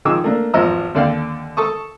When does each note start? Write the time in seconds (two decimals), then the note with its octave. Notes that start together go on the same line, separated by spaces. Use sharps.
0.05 D#3 F3 D#4 G#4 D6 E6
0.24 A3 A#3 D4
0.54 G#1 E2 F3 D#5 A#5 E6
0.95 D#2 D3 D5 F5 G5
1.57 A4 A5 C#6 D#6